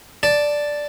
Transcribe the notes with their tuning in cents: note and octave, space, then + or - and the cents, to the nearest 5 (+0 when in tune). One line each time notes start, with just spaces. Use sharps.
D5 +0 A5 +0